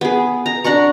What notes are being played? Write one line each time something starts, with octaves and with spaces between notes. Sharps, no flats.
B3 G#4
A#5
D4 F#5 A#5 C#6